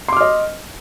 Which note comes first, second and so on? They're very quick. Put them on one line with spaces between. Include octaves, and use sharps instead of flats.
C6 D6 F6 D#5